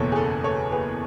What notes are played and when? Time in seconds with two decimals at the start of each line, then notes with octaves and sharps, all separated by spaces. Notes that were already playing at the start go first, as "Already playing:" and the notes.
Already playing: F#1 E2 B2 A4 C#5
0.12 G#4
0.16 A4
0.44 A4 C#5
0.72 G#4 B4